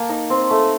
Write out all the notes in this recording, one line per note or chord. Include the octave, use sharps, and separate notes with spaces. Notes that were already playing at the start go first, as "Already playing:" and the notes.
Already playing: A#3 A5
D#4
C4
A3